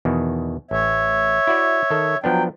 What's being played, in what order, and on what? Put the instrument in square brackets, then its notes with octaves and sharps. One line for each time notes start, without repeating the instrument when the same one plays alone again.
[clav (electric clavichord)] E2 B2 D#3
[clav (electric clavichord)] A1 [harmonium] C#5 E5
[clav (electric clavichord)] E4 F#4 D5
D#3 A4
[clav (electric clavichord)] F3 B3 D4 [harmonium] F#3 G5